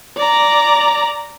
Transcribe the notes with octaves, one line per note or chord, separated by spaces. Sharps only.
D5 A#5